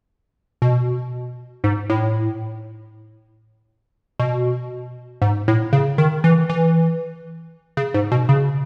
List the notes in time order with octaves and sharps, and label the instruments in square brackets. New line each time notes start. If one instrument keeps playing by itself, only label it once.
[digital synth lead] B2
G#2
A2
B2
G#2
A2
C#3
D#3
E3
E3
C#3
G#2
B2
C#3